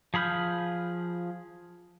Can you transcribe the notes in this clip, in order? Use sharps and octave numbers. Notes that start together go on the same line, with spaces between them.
F3 G#4 B5 F6 G6